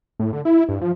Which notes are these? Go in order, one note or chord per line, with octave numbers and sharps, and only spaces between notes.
A2
D3
E4
G2
F3